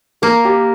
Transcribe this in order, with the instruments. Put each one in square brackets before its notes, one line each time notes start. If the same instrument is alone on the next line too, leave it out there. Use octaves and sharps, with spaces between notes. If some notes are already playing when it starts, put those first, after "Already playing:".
[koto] A#3 [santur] A#4
[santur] G4